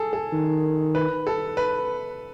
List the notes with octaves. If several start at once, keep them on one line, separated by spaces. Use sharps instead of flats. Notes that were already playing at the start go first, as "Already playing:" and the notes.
Already playing: G#4 A4
A4
D#3
B4
A4
B4